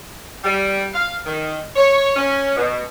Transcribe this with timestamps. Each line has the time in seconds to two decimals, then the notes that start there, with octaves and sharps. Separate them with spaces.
0.44 G3
0.94 F5
1.26 D#3
1.76 C#5
2.16 C#4
2.56 B2